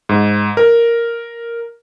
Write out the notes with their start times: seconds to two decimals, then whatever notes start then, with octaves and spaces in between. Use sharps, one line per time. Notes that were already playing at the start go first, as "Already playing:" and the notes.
0.09 G#2
0.57 A#4